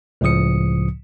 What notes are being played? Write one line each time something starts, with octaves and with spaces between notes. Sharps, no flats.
C#2 A2 C#3 F3 D#6 C#7